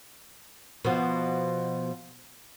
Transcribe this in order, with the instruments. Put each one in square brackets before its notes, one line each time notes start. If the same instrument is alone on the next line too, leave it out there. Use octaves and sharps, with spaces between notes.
[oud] B2 F3